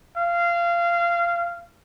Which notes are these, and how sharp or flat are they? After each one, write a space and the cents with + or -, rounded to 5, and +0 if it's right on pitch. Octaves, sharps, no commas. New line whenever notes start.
F5 -20